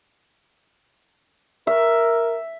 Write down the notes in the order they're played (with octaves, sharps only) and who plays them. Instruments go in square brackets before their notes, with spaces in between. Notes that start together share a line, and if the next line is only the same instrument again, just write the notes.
[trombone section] A#4 [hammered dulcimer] E5